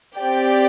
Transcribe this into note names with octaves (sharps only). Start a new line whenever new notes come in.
C4 G4 D5 G5